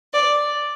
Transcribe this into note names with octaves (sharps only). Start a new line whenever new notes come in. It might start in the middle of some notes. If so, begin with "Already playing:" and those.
D5